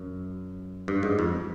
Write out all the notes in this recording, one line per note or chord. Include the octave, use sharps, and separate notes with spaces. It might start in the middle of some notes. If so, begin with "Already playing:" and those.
Already playing: F#2
G2
G#2
F2